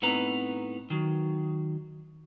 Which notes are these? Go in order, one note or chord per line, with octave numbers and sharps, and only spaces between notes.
A2 B3 C4 D#4 B4 A#5
D#3 F#3